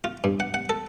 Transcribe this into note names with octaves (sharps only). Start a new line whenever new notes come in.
F4
G2
F#5
F#5
A4